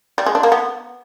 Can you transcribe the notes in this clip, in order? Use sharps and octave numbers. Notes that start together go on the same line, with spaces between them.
G3
G#3
D4
A#3
B3